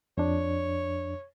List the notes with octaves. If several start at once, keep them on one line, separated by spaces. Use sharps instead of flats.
F2 D4 C#5